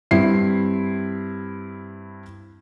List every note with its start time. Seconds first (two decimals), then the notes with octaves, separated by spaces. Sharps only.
0.11 G2 C4 E4 C7